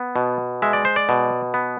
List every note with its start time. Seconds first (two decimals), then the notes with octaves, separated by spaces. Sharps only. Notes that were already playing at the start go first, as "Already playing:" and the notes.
Already playing: B3
0.16 B2
0.62 G#3 E5
0.73 D5
0.85 C5
0.96 D5
1.09 B2
1.54 B3